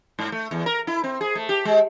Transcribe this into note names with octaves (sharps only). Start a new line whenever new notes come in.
G#2
A3
E2
A#4
E4
C4
G#4
A3
G4
G#3